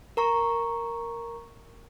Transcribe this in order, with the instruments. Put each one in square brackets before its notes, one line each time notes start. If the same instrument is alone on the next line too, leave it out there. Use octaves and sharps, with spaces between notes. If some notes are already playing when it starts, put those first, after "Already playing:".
[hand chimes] A#4 A#5 C#6